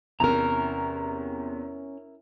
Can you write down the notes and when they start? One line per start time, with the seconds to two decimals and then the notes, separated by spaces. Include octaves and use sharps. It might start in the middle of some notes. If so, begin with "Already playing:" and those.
0.20 E2 C3 C#4 E4 A#4 A#5